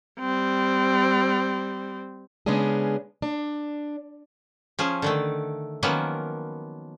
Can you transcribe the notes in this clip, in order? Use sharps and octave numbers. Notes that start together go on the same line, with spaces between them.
G3 C4
C#3 G#3 B3 C#4 D4 G#4
D4
F3 C#4 G#4
D3 D#3 A3
D#3 F3 F#3 A#3 B3 C#4